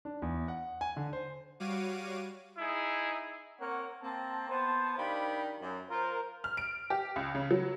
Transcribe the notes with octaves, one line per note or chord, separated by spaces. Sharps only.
D4
E2
F#5
G#5
D3
C5
G3 F#4 C#5 F5 D6 D#7
D#4 E4 G#4
A#3 C4 A#4 C#5 F#5
A#3 C4 A5
B3 C5 A5
D#3 D4 G4 F5 B5
F#2
F4 A#4 C5
F6
D7
G4
C#2
C#3
F#3